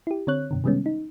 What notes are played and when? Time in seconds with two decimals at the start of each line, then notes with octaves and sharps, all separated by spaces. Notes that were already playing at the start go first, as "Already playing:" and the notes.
0.07 E4 G4
0.27 D3 C4 C#5 F#6
0.51 F#2 B2 D3
0.64 C3 D#3 G3 G#3 B3 C#4
0.86 D#4